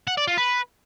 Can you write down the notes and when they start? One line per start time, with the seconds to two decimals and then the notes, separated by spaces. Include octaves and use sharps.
0.07 F#5
0.17 D5
0.27 F4
0.37 B4